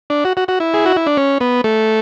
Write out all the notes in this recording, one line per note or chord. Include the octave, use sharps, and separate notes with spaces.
D4
F#4
F#4
F#4
E4
G#4
F#4
E4
D4
C#4
B3
A3